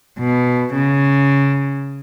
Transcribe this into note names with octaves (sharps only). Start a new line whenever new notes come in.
B2
C#3